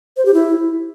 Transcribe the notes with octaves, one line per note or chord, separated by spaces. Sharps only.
C5
G4
E4